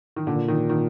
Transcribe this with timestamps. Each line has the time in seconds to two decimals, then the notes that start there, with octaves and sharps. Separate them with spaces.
0.16 D#3
0.27 A#2 D3
0.48 D#3
0.70 D#3